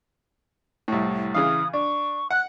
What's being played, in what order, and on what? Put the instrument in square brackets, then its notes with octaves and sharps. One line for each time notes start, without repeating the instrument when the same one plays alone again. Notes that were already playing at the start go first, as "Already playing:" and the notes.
[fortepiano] C2 A2
[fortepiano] C#3 E3 F5 [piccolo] D#6
[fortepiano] D4 [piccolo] C#6
[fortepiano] F#5 [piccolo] F#6